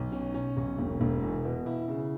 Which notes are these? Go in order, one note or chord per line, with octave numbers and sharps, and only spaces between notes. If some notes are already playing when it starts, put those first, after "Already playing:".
Already playing: B1
C#4
C#4
B1
E1
E1
E2
B2
E4
C#3